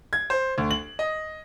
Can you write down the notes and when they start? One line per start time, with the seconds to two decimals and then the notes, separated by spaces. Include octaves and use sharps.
0.13 G#6
0.30 C5
0.58 D2
0.71 F#7
0.99 D#5